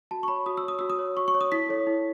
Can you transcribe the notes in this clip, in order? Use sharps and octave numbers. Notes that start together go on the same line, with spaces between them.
F#4 A5
C#6
C#5 B5
F#4 D#6
E6
C#5 D#6
F#4 E6
D#6
C#5
F#4 C#6
C#6
C#5
D#6
E4 B6
A4 C#5
E4